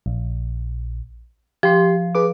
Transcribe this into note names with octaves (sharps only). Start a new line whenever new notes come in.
A#1
F3 G4 C6
G#4 B4 D6